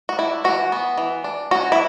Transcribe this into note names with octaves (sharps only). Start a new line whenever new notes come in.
F#4
D4 E4
E3 F#4
B3
E3
D4
C#4 F#4
E4